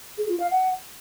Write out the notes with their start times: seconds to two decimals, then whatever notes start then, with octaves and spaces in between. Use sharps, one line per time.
0.18 G#4
0.29 F4
0.40 F5
0.51 F#5